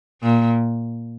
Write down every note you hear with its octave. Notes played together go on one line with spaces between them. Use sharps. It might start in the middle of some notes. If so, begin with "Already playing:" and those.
A#2